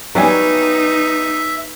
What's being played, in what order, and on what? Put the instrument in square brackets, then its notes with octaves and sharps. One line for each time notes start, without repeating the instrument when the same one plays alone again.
[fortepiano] F#3 G3 G#5 [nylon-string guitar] B3 [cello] D#4 [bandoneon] E5